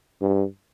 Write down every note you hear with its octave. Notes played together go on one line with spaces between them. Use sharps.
G2